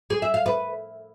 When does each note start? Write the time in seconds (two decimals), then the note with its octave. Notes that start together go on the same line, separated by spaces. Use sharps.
0.10 G#4
0.22 E5
0.34 F5
0.46 B4